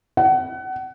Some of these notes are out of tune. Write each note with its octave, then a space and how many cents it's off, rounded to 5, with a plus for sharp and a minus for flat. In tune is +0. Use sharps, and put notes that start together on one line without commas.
F#5 +30